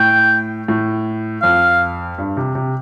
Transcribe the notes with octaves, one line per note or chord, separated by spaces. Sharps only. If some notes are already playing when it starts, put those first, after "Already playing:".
Already playing: A2 G5
A2
F2 F5
G2
C3
C3